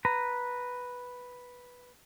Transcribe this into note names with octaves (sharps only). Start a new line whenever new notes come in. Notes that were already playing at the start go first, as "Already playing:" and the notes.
B4 A#5